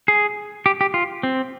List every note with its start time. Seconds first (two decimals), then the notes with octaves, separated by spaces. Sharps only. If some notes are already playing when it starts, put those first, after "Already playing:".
0.08 G#4
0.66 G4
0.81 G4
0.94 F4
1.23 C4